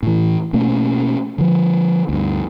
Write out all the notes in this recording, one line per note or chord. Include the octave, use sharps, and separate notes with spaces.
A2 E3
B2 A3 A#3 C#4
D3 F3
D2 G2